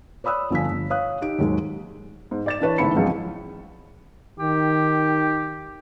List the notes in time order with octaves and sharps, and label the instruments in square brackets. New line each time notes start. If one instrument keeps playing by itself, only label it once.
[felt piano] C#5 D5 B5 D#6 E6 F#6
G1 F3 G#5 B6
G1
C#5 F5 D#6 F#6
D#4 G4 D7
D#2 G#2 F#3 G#3
G#2
D5 A6 E7
E3 D4 B4 C#5
A1 G#2 D3 E4 B5 C#7
C#2 F3 F#3 G#3 C4
[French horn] D#3 [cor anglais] G4